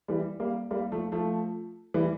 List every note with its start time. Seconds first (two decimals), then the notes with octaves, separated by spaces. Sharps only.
0.08 E3 G3
0.40 G3 A#3
0.71 G3 A#3
0.92 F3 A3
1.12 F3 A3
1.94 E3 G3